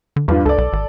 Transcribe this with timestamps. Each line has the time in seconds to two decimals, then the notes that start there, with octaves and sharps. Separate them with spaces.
0.16 D3
0.28 E2 G2 D4 F4
0.45 C#2 A4 D5
0.58 B1
0.73 G#1